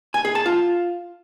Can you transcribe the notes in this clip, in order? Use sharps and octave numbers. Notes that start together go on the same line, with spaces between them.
G#5
G#4
A5
F4